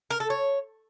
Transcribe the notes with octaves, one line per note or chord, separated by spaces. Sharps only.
A#4
A4
C#5